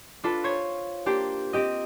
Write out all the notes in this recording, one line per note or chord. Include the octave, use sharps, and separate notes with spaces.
D4 F4 A4 B4
C5 C#5 G#6
A#3 D4 G4 C5 G5
C4 G4 D#5